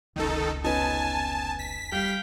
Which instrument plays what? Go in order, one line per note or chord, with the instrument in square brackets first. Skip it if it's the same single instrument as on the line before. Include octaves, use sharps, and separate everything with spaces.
[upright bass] F1 C#2 [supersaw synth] D#3 D#4 A4
[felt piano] B3 C#4 D#4 [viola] G#5 [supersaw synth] A5
[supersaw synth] B6
[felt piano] G3 [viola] F5 G5